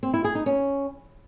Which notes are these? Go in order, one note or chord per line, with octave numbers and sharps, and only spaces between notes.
C4
E4
G#4
D#4
C#4